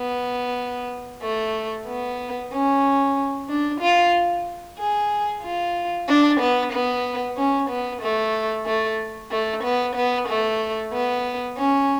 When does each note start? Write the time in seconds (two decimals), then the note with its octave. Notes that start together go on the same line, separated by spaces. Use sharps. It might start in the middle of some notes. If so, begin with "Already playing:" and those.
Already playing: B3
1.23 A3
1.88 B3
2.52 C#4
3.49 D4
3.81 F4
4.79 G#4
5.43 F4
6.08 D4
6.40 B3
6.73 B3
7.37 C#4
7.70 B3
8.02 A3
8.66 A3
9.31 A3
9.64 B3
9.96 B3
10.28 A3
10.93 B3
11.58 C#4